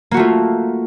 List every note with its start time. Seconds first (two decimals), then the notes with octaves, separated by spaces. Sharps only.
0.11 A#3
0.14 F#4
0.17 A3
0.19 F4